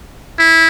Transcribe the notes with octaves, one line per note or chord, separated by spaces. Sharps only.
E4